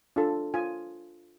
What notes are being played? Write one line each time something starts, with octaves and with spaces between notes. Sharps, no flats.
D4 F4 A4
F4 G#5